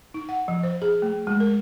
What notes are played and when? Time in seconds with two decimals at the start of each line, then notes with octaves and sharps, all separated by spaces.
0.14 D#4
0.29 F#5
0.48 F3
0.63 C5
0.82 G#4
1.02 A3
1.27 G#3
1.40 A#4